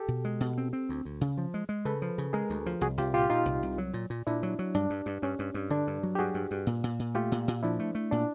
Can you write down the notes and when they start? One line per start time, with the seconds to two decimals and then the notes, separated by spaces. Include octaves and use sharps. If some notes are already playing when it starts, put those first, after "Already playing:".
Already playing: G4 A4
0.08 B2
0.25 G#3
0.40 B2
0.58 C4
0.73 C4
0.89 D2
1.05 D2
1.21 C#3
1.38 F3
1.54 G#3
1.69 G#3
1.85 C#3 A4 B4
2.02 F3
2.18 C#3
2.33 G#3 G#4 A#4
2.50 D2
2.66 F3
2.81 C2 F#4 G#4
2.98 C2 F4 G4
3.14 A#2 F4 G4
3.30 A#2 D#4 F4
3.45 C2
3.63 C2
3.78 F#3
3.94 A#2
4.10 A#2
4.27 A#2 D4 E4
4.43 F#3
4.59 F#3
4.74 G2 D4
4.90 G2
5.06 G2
5.22 G2 C#4
5.39 G2
5.54 G2
5.70 D3 D4
5.87 G2
6.03 F#3
6.15 G4
6.19 G2 F#4 G#4
6.34 G2
6.51 G2
6.67 A#2
6.84 A#2
6.99 A#2
7.15 A3 F4 G4
7.32 A#2
7.48 A#2
7.63 F3 D4 E4
7.80 A3
7.95 A3
8.11 A#2 D4